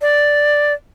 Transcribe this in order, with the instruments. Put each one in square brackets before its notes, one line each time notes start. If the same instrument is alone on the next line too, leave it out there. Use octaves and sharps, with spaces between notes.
[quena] D5